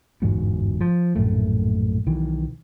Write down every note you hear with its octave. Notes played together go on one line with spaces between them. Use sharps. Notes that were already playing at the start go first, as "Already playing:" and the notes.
G1 E2 G#2 B2
F3
A#1 F#2 A2 A3
B1 D#3 E3